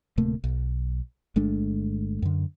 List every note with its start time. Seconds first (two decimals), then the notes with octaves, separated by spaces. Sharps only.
0.18 D1 C3 A3 A#3
0.44 B1
1.36 G1 G#3 A3 D4
2.22 F#2 D3